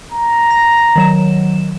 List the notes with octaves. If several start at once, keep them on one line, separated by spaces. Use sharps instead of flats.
A#5
A#6
D#3 F#3 E7